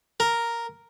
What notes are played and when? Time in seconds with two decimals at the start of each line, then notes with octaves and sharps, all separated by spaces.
0.20 A#4